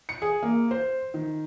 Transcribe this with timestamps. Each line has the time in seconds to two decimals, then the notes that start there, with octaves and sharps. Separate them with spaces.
0.09 C#7
0.22 G#4
0.43 A#3
0.71 C5
1.14 D#3